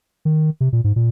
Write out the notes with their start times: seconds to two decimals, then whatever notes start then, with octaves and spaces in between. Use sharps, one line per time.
0.25 D#3
0.60 C3
0.73 A#2
0.84 G#2
0.96 A#2